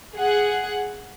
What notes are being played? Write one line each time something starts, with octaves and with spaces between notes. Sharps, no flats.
G#4 F#5